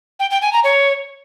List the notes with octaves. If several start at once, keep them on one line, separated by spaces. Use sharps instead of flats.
G5
G5
G#5
A#5
C#5